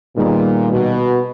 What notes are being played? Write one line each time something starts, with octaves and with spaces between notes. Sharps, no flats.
A#2 D#3 G3 B3 D#4 G#4
B2